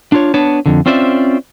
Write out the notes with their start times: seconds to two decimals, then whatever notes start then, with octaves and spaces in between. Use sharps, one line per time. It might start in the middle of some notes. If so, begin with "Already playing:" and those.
0.12 D4 F4 C#5
0.34 B3 D4 C#5 A5
0.66 F2 D3
0.86 C4 C#4 F4 C5 D5 E5